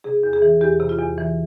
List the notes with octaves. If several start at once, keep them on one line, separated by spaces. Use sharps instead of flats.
C3 G#4
E2
G#4
E3
E2 G4
C3
F4
E2
E3